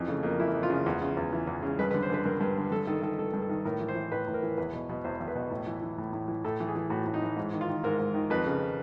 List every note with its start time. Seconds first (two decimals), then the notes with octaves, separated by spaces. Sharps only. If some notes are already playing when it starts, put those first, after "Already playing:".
Already playing: F2 E3
0.08 C#3 A3
0.23 F2 A#3
0.39 E3 E4
0.54 F2
0.63 F4
0.70 C#3
0.86 E2
1.02 C#3
1.17 E2
1.33 E3
1.47 E2
1.63 C#3
1.79 G2 B4
1.91 B4
1.94 D3
2.03 C5
2.10 D3 B4
2.25 G2 A#4
2.41 G2
2.57 D3
2.72 G2 A4
2.87 D#3 A4
3.02 D#3 A4
3.19 G2 A4
3.34 G2
3.42 A4
3.49 D#3
3.65 A2 A#4
3.80 E3
3.88 C5
3.95 E3
4.12 A2 B4
4.28 A2
4.34 A#4
4.43 E3
4.58 E2 B4
4.73 B2
4.89 B2
5.04 E2 C5
5.20 E2
5.28 B4
5.35 B2
5.50 A2
5.67 E3
5.82 E3
5.98 A2
6.13 A2
6.28 E3
6.44 A2 A4
6.60 E3
6.68 G#4
6.75 E3
6.90 A2 F#4
7.07 A2
7.14 D#4
7.22 E3
7.37 G#2
7.53 D#3
7.61 F4
7.69 D#3
7.84 G#2 A#4
7.99 G#2
8.14 D#3
8.30 F2 B4
8.46 C#3